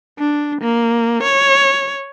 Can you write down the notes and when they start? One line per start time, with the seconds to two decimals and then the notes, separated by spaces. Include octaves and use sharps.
0.19 D4
0.61 A#3
1.23 C#5